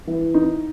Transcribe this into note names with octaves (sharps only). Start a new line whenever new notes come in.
E3
D#4